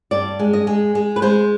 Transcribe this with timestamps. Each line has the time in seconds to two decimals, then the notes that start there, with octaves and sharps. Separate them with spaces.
0.11 G2 D5
0.39 G#3
0.53 D#5
0.67 G#3
0.95 G#3
1.16 B4
1.22 G#3 C5